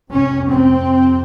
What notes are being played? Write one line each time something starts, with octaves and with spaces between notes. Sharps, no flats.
F2 C3 C#4
C4